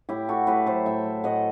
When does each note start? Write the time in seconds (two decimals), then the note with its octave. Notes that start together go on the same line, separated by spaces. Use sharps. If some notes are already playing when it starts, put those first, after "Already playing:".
0.09 A2 E4 G4
0.29 A3 F#4 A4
0.47 A2 G4 B4
0.66 F#3 A4 C5
0.85 A2 E5 G5
1.05 A3
1.24 A2 D#5 F#5